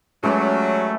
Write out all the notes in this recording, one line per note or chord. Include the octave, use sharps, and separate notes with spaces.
F#3 G#3 A3 C#4 G4 B4 D5